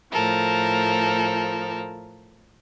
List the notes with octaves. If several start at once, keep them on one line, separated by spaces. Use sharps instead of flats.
A2 F3 A4 A#4